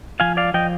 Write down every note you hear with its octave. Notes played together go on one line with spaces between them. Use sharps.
F3 F5 G#5
D5 F5
F3 D#5 G5